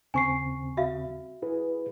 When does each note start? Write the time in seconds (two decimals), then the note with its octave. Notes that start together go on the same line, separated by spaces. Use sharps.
0.14 D#2 C#3 C4 G#5 C#6 C7
0.77 F#4 E5 F5
1.42 E4 G#4 B4